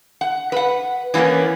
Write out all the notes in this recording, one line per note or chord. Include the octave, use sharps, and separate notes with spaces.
F#5
B4 F#5
E3 F#3 A#3 B3 C#4